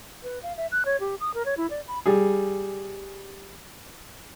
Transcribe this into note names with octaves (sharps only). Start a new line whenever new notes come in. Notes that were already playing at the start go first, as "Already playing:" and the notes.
B4
F5
E5
F#6
C#5
G4
D#6
A#4
C#5
E4
D5
B5
G3 G#4